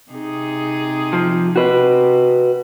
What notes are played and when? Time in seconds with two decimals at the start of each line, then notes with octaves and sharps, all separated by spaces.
0.11 C3 D#4 G#4
1.13 F3
1.56 C3 F#4 B4